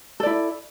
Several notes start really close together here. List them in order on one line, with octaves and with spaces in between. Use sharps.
A4 D5 E4